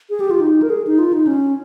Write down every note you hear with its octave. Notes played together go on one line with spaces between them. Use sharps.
G#4
G4
F4
D#4
A#4
G#4
D#4
F4
D#4
C#4